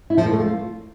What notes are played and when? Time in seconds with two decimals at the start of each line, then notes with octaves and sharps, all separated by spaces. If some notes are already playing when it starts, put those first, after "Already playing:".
0.10 E4
0.18 F3
0.25 A#3
0.32 A3
0.40 F4